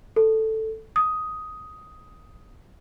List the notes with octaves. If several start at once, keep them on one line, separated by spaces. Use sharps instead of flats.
A4
D#6